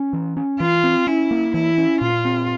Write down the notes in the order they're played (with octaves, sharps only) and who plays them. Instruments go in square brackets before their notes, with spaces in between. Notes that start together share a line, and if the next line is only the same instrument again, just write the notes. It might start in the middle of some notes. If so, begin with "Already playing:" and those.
Already playing: [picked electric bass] C#4
E3
C#4
[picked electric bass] E3 [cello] F4
[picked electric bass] C4
[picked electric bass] C#4 [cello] E4
[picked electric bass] A#3
[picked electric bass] E3 [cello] E4
[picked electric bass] C#4
[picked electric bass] A#2 [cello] F4
[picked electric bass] C4